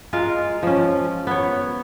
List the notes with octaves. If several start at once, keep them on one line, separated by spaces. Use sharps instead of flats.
G#3 F4 A#4 F5
F3 C#4
B3 C#5